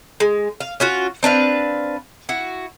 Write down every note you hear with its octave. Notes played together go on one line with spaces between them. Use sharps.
G#3
F5
C#4 F4 F#4
C4 D4 B4 F5
E4 F#4